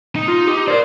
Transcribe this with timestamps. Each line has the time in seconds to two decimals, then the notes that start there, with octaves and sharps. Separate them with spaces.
0.16 D#4
0.28 F4
0.47 G4
0.68 A#4 C5 D5